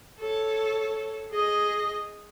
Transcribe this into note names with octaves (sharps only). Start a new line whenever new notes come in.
A4 C#5
G#4 D#5